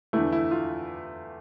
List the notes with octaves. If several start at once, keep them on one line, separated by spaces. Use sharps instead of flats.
E2 D3 A3 E4
E4
F4